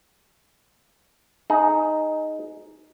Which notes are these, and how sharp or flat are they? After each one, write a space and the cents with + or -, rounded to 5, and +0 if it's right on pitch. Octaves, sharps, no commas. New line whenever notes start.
D#4 +0 G#4 +20